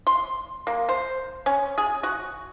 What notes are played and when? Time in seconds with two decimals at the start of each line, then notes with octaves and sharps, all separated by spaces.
0.07 C6
0.67 A#3
0.89 C5
1.46 C#4
1.78 G#4
2.03 F#4